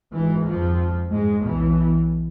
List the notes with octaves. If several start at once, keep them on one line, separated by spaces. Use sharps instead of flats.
G#1 G#2 E3
F2 F3
G#2 G#3
B1 B2 E3